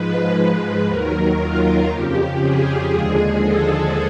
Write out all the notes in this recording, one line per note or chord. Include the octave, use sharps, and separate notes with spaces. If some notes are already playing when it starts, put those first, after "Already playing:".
Already playing: G#2 F3 G#3 B4
B4
D#2 D#3 F#3 A#4
F4
F2 C#3 F3 G4
G#4
D#2 D3 F3 G#3
A4